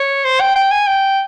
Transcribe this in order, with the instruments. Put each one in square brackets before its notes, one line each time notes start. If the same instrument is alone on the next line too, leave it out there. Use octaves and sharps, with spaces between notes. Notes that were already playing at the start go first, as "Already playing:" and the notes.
Already playing: [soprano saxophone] C#5
C5
G5
G5
G#5
G5